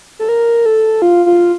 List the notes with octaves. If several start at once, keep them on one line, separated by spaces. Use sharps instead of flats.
A4
A#4
A4
F4
F4